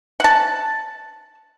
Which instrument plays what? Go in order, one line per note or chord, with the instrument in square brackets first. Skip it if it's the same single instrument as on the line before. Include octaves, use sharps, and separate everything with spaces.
[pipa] F#5 A5